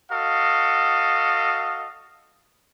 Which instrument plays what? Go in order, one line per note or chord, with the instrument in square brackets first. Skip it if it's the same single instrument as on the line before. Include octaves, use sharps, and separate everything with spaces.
[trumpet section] F#4 A4 D#5 F5